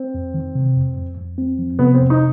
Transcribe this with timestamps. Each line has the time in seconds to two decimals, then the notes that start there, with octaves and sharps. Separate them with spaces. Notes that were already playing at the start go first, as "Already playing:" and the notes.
Already playing: C4
0.14 F2
0.34 D#3
0.55 C3
0.76 F2
0.97 F2
1.17 F2
1.38 C4
1.58 F3
1.79 C3 B3
1.94 C4
2.00 F2
2.10 D#4